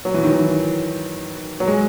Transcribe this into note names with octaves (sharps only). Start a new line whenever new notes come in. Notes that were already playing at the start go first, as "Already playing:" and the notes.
F#3
E3
D#3
E3
F#3
G#3